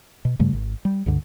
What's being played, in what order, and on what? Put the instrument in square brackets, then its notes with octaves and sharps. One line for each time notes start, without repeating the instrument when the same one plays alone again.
[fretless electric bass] B2
G2 C#3 G3 A3
G#1
G3
C#2 G2 D3